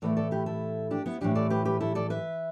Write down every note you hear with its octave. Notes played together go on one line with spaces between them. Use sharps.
A2 E3 A3 A4 D5
A4 D5
G4 B4
E4 A4
D4 G4
B3 E4
A2 E3 G3 D4 G4
A4 D5
G4 B4
G4 B4
E4 A4
A4 D5
B4 E5